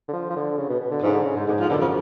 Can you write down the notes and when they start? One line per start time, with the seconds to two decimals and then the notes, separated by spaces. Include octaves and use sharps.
0.08 D3
0.13 F3
0.30 F3
0.36 D3
0.57 C#3
0.69 B2
0.80 B2
0.91 D3
1.03 G#2 F3
1.09 C#3
1.14 D3
1.24 C#3
1.36 G#2
1.47 G#2 B2 D3
1.60 F3
1.69 F#2 B2 D3
1.80 C#3 F3